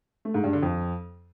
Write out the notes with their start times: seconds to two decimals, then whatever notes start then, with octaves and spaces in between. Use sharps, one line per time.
0.25 A3
0.34 G#2
0.44 G2
0.53 D3
0.63 F2